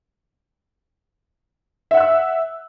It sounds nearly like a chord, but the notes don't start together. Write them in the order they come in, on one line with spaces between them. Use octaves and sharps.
E5 F#5 F#6 E6